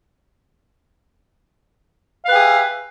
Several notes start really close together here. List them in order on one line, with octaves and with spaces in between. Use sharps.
F5 B4 G4 G#4 E5